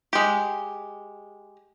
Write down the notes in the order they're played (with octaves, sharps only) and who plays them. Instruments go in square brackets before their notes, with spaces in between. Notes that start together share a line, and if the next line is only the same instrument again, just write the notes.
[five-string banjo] G#3 G4